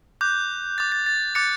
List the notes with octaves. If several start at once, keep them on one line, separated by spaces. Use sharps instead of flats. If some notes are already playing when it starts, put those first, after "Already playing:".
D6 F#6 G6
D6 G6 A6
A6
A6
D6 F#6 A6 C#7